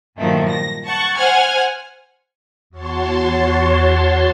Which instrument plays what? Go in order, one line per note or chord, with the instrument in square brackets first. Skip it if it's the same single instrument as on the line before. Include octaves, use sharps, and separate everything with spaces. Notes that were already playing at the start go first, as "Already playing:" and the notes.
[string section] G2 A#2 D#3 F3 F#3 A3
A#6
F#5 A5 C#6
C5 F#5 G#5 F6 G#6
[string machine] E2 F#4 C#5 A5 C6